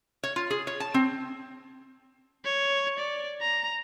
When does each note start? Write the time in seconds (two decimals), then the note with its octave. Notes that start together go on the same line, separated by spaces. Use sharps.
0.24 C#5
0.36 F4
0.51 G#4
0.67 C#5
0.80 A5
0.94 C4
2.45 C#5
2.99 D5
3.41 A#5